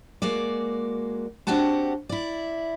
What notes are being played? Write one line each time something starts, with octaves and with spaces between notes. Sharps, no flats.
G#3 A#3 F#4 D5
C4 D4 F#4 G4 F#5 A5
E4 D5